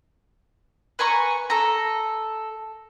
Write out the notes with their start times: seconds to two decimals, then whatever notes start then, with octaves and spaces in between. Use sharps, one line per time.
0.99 B4 G#5 A#5 C#6
1.50 A4 A#5